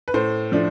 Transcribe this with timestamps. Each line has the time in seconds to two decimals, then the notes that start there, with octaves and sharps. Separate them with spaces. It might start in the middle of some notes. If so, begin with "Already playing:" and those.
0.08 B4
0.14 A2 C5
0.52 F3 A3 D4